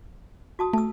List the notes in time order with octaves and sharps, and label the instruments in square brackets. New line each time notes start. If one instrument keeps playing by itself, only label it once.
[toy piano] F#4 A5 D#6
[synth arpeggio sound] A3 [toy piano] A5 E6